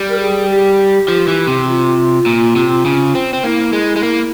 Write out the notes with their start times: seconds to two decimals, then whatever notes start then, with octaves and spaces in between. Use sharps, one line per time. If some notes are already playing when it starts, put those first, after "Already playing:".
Already playing: G3
0.09 A#4
0.20 G#4
0.49 G4
1.08 F3
1.28 E3
1.47 C3
1.68 F4
2.26 A#2
2.56 C3
2.85 C#3
3.15 C4
3.34 C4
3.43 A#3 E4
3.73 G#3
3.96 G#3
4.03 A#3